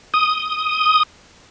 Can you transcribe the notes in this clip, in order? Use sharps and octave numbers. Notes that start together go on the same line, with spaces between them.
D#6